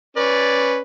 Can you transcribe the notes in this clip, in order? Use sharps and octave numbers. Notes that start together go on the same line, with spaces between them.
C#4 B4 D5